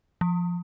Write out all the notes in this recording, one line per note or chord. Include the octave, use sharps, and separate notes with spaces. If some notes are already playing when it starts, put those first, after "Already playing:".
F3